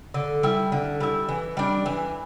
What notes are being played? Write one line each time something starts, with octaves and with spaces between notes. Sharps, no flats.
D3
G3 E4
D3
G3 E4
E3
G3 D4
E3